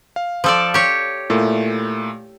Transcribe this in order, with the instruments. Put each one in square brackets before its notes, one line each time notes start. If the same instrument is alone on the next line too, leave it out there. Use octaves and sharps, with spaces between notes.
[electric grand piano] F5
[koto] F3 A4 D5
G4 C#5
[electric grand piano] A#2 A3 E4